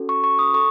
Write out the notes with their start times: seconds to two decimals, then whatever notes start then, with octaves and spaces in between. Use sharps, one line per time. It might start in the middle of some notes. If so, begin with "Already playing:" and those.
Already playing: C#4 F#4 A4
0.09 C#6
0.24 C#6
0.39 D#6
0.54 A4 C#6